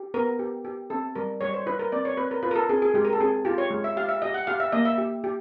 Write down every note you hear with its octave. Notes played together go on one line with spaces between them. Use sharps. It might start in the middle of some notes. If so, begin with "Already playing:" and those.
Already playing: G4
B3 A#4
G4
G4
C4 A4
G3 A#4
G3 C#5
C5
E4 B4
A#4
C4 D5
C#5
C4 B4
A#4
F4 B4
A#4
A4
C4 G#4
G#4
G#3 G4
A#4
A4
C4 G#4
F4 G4
C#5
G#3
E5
G4 F5
E5
G4 D#5
F#5
G4 F5
E5
A#3 D#5
E5
G4
G4